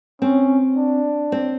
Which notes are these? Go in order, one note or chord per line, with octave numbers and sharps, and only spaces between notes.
C4 C#4
D4
C4